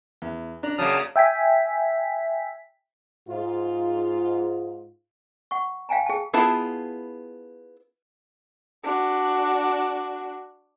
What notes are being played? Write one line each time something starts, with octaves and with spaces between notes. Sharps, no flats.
E2
D4 A#5 F#6
F#2 C#3 F#3 A#3 A5 D#6 F6
E5 G5 G#5 B6
G#2 F4
F#5 C#6
F5 G5 G#5 A#5
G#4 G5 A5
B3 E4 F4 G#4 A5
D4 F#4